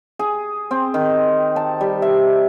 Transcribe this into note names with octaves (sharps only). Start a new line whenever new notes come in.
G#4
C4
D#3
A5
G3
E5